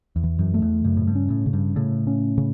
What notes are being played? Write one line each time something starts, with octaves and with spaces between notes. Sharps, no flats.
E2
E3
F#2
A3
E2
F#2 C#3
A2
G2
C#4
A2
C#3
G2
A2 C#3
C#4
C#3